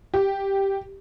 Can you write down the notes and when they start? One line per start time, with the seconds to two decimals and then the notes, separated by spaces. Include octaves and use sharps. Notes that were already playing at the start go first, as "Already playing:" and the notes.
0.14 G4